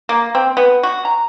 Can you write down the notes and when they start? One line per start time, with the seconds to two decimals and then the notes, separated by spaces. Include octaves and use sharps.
0.09 A#3
0.35 C4
0.57 B3
0.83 F#4
1.05 A#5